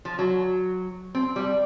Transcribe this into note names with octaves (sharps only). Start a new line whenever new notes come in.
F3
F#3
C4
G3